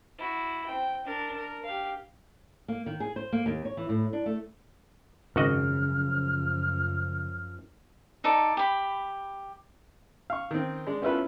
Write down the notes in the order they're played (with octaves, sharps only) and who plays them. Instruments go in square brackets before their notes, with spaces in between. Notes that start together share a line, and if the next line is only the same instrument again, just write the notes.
[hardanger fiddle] E4 F#4
C4 G5
D4 A#4
A#4
G4 F5
[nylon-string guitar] A#3
D#3
G#4
C5
A#3
D#2
C#5
E3
A2
D4
A3
[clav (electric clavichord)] G#1 F#4 D#5 [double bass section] F#2 F3 [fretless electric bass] C#3 [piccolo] F6
[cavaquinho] D#4 A4 D5
G4 B5
[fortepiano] F5 C#6
D#3 C4
G#3 D4
B3 C#4 E4 F4 A4 B4